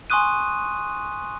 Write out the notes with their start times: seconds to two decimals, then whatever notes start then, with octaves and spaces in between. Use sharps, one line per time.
0.10 G#5 C6 C#6 D#6 F#6 D#7